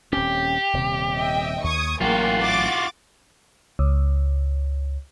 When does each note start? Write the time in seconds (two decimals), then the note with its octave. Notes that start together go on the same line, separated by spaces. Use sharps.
0.13 D#1 C4 C#4 G4
0.73 D#1 C3
1.15 D#5 E5 G5
1.64 D#2 C#6 D#6 G#6
2.01 A1 F#3 A#3 F4 F#4 G#4 G5
2.42 F#5 D6 A6
3.79 C#2